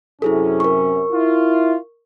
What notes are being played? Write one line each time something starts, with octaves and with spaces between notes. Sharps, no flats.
F#2 C3 C#4 E4 G#4 A4
A#4 C#6
E4 F4